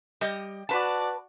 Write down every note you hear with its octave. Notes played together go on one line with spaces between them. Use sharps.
G3 G4 D#5
F#4 B4 D5 A5